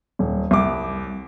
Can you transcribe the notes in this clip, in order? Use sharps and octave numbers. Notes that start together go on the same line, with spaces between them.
D#1
C2 D6